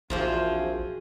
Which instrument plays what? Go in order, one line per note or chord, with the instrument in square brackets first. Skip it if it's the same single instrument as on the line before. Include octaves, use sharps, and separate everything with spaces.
[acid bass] A#1 [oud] E2 F3 C4 [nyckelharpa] F#4 G#4